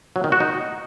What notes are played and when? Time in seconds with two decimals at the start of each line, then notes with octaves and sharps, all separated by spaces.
0.16 F#3
0.24 D#3
0.32 F#4
0.40 D#4